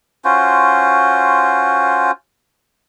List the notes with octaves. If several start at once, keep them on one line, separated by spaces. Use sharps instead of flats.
C#4 F4 F#4 C5